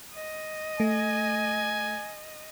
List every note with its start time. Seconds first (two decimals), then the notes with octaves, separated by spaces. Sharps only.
0.14 D#5
0.80 A3 G#5